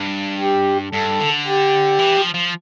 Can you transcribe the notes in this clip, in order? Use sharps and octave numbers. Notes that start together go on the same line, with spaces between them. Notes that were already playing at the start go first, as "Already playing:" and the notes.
Already playing: G2
G4
G2 A4
D3
G4
E3
F3
F3